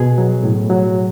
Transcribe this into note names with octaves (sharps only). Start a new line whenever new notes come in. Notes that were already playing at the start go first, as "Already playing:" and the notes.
Already playing: B2 G#4
F#3
A2
F#3